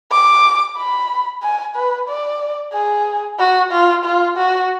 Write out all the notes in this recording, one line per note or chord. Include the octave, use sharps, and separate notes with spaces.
D6
B5
G#5
B4
D5
G#4
F#4
F4
F4
F#4